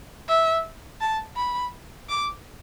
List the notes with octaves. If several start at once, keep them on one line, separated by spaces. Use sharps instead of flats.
E5
A5
B5
D6